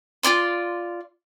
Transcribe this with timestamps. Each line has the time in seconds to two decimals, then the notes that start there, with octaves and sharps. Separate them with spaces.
0.23 F4 C#5 D5 C6